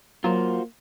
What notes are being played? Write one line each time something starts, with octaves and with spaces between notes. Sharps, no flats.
F#3 A#3 F4 F#4 C5